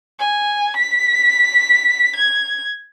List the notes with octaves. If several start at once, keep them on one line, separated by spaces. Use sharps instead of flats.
G#5
B6
G#6